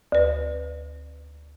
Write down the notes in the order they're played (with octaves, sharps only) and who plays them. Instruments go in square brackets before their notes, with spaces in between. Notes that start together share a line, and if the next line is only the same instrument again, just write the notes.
[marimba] D2 B4